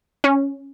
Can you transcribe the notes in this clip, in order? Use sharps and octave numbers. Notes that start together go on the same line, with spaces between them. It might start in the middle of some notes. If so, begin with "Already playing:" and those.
C#4